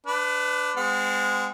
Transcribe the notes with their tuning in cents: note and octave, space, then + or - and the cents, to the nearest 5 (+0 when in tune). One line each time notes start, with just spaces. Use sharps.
D4 +0 B4 +30
G#3 -5 C4 -40 F#5 -40